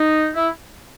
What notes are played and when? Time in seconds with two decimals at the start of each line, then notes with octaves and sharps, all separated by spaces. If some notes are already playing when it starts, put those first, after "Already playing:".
Already playing: D#4
0.35 E4